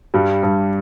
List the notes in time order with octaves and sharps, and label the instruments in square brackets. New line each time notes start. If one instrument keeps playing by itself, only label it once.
[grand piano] G2 G3
G2